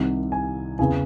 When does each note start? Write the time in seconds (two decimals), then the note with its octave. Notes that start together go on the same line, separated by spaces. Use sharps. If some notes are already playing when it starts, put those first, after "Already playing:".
Already playing: C2 C3 D#3 F#5
0.32 G#5
0.79 E2 C#3 E3 G#5